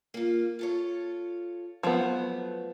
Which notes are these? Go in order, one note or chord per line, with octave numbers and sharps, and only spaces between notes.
A#3 F4
F4 A4 C#5
F3 F#3 A3 B3